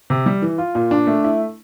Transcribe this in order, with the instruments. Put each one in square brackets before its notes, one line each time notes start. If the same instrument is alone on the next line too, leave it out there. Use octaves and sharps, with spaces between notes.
[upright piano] C3
G3
E3
F4
A#2
D4
A3
E4